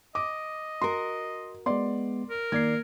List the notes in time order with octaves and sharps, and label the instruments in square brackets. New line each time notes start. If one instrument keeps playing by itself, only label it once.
[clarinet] D#5 [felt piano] D6
[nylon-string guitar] F#4 A#4 [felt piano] C6
[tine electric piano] G#3 B3 [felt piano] D5 C6
[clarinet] A#4
[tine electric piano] D#3 D5 C7 [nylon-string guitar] A#3 [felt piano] G#6